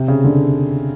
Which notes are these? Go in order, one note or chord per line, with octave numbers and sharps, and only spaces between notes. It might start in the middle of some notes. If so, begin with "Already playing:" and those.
Already playing: C3
C#3
D3